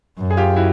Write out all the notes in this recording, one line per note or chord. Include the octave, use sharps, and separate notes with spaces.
F#2
G#4
F4 G4
E4 F#4